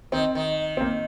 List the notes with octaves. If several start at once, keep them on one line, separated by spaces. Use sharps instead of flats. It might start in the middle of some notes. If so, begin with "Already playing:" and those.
D#3 C4
D#3
C4
A#3